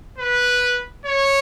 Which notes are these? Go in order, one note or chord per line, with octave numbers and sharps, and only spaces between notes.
B4
C#5